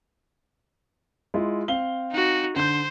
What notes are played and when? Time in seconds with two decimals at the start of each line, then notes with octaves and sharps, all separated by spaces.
1.34 G#3 E4 F4
1.68 C4 F5 G7
2.11 D#4 F#4
2.56 D3 C5 G6